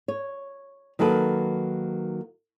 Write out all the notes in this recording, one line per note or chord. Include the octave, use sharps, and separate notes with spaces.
C#5
D#3 F#3 A#3 A4 B4